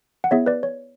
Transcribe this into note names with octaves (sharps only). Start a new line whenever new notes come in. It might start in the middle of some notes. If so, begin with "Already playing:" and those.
F#5
B3 E4 G#4 C#5 E5
B4 D5
C#5